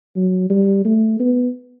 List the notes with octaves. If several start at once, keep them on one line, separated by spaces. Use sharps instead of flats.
F#3
G3
A3
B3